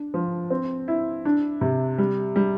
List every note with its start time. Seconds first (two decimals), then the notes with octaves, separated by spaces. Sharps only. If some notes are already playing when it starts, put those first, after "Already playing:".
Already playing: D4
0.14 F3
0.50 C4
0.88 E4
1.25 D4
1.61 C3
1.98 G3
2.36 G3